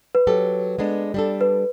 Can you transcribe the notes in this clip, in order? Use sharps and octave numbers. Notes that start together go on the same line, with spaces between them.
B4
F#3 G4 A4
G#3 B3 D4
G3 D4 A4
B4